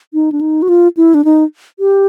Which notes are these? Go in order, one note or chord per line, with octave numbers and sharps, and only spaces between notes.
D#4
D4
D#4
F#4
F4
E4
D4
D#4
G4